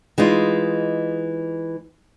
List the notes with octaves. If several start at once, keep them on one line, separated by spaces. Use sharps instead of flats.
E3 G#3 D#4 F4